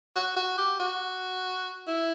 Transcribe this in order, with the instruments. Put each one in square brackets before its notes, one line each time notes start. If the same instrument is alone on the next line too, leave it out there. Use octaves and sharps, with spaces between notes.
[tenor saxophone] F#4
F#4
G4
F#4
E4